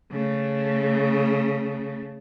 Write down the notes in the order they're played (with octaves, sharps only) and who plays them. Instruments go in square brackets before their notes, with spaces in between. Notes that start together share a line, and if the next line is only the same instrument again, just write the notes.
[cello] C#3 A3